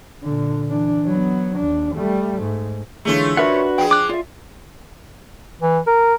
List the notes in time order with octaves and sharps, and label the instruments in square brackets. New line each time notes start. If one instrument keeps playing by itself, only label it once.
[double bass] A#2 D3
E3 D4
F#3 B3
D#2 D4
G3 A3
G#2
[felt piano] D3 E3 G#3 [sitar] A3 C#4 F4
[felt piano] D4 [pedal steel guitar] F#4 B4 F#5 [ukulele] A#4 D5 E5
[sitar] F3 G#4 [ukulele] G5
[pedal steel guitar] D6 F#6
[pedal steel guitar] F4 [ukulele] D5 E5
[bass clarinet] E3
A#4